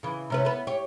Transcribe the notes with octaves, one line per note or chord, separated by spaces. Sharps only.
C#3 E3
C3 C#4 B4
B3 B4
G4 C#5